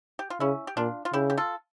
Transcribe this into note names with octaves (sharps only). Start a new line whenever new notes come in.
G4
F4
C#3 C#4 E4
G4
A#2 D4 F4
F4
C#3 E4 G4
G4
F4 A4